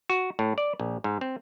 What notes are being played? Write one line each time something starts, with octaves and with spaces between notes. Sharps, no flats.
F#4
A2
D5
A#1
G#2
C4